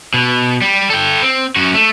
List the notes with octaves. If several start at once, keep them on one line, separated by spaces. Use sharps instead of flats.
B2
G3
A4 G5
C4
F#2 F#4
A3